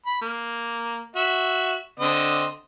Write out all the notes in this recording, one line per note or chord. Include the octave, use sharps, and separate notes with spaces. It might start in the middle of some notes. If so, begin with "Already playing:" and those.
B5
A#3
F#4 E5
D3 C4 D#5